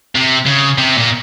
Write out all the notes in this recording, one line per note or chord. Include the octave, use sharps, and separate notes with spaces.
C3
C#3
C3
A#2